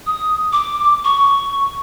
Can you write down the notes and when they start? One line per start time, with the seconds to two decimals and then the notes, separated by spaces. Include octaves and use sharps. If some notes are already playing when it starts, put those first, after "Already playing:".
0.06 D#6
0.53 D6
1.04 C#6